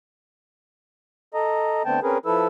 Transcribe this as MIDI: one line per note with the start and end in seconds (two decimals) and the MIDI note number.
1.34 1.83 69
1.34 1.83 75
1.34 1.83 82
1.85 2.00 50
1.85 2.00 57
1.85 2.00 59
1.85 2.00 60
1.85 2.00 79
1.85 2.00 81
2.03 2.18 60
2.03 2.18 61
2.03 2.18 68
2.03 2.18 70
2.03 2.18 71
2.26 2.48 53
2.26 2.48 64
2.26 2.48 69
2.26 2.48 71
2.26 2.48 88